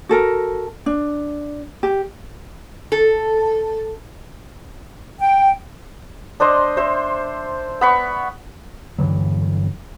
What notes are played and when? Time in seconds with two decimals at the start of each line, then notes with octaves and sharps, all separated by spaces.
0.09 F#4 A4 A#4
0.86 D4
1.83 G4
2.92 A4
5.20 G5
6.40 D4 C5 D#5 C6
6.77 C5 E5
7.81 B3 B5 C#6
8.98 G2 D3 E3 F#3